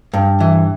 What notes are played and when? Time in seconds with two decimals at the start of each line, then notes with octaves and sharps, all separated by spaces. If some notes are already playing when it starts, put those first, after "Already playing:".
0.13 G2
0.40 E3